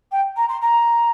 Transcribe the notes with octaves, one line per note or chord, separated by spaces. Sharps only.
G5
A#5
C6
A#5